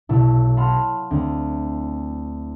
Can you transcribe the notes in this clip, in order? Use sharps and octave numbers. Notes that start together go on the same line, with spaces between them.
B1 B2 E4 A4
F5 F#5 A5 B5 C6
D2 C4